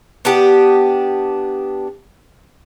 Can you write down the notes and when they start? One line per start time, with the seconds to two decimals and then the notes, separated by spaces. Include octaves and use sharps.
0.25 B3 D4 G4